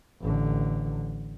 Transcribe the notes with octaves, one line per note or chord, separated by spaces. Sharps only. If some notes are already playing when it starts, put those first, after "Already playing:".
A1 D3